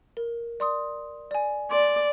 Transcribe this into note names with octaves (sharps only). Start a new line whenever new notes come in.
A#4
D5 C6 D#6
D5 G#5
D5 C6